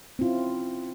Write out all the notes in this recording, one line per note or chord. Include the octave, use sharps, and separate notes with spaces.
C4 C#4 E4 F4